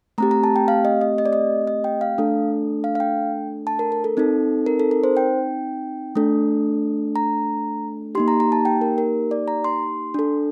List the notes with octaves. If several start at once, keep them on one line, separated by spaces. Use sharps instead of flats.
A3 C4 G4 A#5
A#5
A5
G5
F5
D#5
D#5
D#5
D5
D#5
D#5
G5
F5
A3 D4 A4
F5
F5
G5
A5
A#4
A#4
A4
C4 D#4 A4
A#4
A4
A#4
C5
G5
A3 D4 A4
A#5
A#3 D#4 G4 C6
A#5
A#5
A5
G5
A#4
A#4
D5
A#5
C6
D4 A4